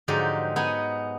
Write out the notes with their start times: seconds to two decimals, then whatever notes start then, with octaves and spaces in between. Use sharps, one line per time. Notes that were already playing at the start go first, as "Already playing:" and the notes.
0.08 G#2 D3 F3 F#3 D#4 G4
0.56 B3 D#4 F#5 G#5